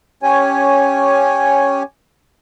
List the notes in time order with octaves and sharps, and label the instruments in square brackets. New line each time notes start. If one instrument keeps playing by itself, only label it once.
[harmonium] C#4 G4 C#5 G#5